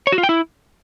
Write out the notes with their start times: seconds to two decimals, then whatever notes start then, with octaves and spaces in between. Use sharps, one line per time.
0.07 C#5
0.12 F#4
0.18 F4
0.23 G5
0.29 E4